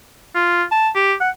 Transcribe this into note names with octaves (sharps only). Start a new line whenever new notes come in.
F4
A5
G4
F#5